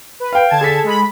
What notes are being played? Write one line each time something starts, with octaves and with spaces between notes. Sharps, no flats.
B4
F5 G5
D3 A5 G#6
G#4 A4 B6
G#3 B5